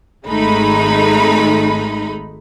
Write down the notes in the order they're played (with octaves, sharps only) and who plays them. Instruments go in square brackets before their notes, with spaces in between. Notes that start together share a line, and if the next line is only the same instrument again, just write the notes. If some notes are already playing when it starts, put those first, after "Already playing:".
[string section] G#1 G#3 A3 D#4 B5